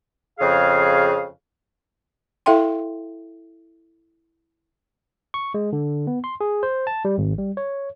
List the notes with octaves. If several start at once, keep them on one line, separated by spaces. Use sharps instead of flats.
F2 C#3 G#4 F5
E4 A4 E5 F5 G5 C6
C#6
G#3
D3
B3
C6
G#4
C5
A5
G3
G#1
G3
C#5